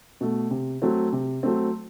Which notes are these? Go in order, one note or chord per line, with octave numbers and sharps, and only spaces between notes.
B2 A3
C3
F#3 A3 C4
C3
F#3 A3 C4